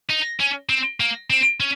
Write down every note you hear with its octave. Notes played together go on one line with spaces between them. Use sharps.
D#4
C#4
C4
A#3
C4
C#4